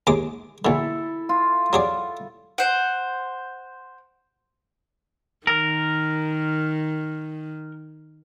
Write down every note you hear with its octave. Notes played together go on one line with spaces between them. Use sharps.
D#2 G#3 D6
A#1 D3 E4 A4
F4
F#3 G#4 D5
C5 F#5
D#3 A#4